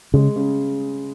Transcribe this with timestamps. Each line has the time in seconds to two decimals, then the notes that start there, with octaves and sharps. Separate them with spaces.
0.14 C#3 G#3
0.36 C#3